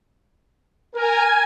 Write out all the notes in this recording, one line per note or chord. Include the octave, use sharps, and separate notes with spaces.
A#4 G#5